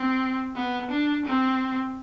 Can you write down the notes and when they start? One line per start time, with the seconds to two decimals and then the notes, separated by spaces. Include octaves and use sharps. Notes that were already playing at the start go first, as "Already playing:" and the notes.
Already playing: C4
0.56 B3
0.90 D4
1.26 C4